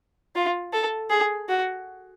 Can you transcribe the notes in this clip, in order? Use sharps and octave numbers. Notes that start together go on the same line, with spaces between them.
F4
A4
G#4
F#4